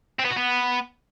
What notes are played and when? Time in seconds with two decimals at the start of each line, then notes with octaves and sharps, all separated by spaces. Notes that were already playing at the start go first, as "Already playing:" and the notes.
0.19 C4
0.25 B3
0.30 F#4
0.36 B3